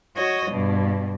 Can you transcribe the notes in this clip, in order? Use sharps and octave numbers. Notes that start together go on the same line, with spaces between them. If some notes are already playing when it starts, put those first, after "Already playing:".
F#4 C#5 D#5
G2 B2